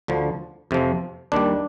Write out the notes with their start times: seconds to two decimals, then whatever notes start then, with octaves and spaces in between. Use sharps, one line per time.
0.08 D2 D3 F3
0.71 F2 C3 F3
1.32 D#2 D#3 G3 D4